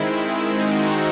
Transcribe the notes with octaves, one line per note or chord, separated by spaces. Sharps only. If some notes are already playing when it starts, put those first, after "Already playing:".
Already playing: D#3 G#3 C4 E4
D#3 G#3 C4 D#4 F#4